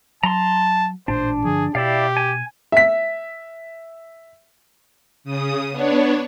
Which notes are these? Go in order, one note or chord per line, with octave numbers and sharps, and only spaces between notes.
F#3 A5 A#5 C6
A1 A#2 D4 C5
G2 D3 F3 G#4
B2 E4 G4 D5 F5
G#5
E5 B6
C#3 D#6
B3 D4 C#5